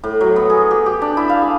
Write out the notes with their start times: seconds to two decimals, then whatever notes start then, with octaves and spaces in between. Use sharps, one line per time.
0.04 A2
0.21 F#3
0.36 B3
0.50 G#4
0.71 G4
0.86 G4
1.02 D4
1.17 E4
1.29 F5
1.42 G#4